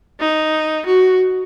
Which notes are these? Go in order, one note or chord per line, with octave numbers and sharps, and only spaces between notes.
D#4
F#4